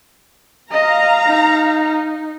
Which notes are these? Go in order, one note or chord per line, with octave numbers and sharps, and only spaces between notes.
D#5 F5 A#5
D#4